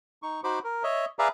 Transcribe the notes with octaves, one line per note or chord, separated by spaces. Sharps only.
D#4 C#6
D#4 F#4 C5 B5 D6
A#4
C#5 D#5 E5
G#4 B4 D5 E5 F5 A#5